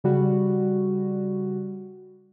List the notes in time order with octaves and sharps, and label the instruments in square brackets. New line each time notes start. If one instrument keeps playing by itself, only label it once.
[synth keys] C#3 G3 F#4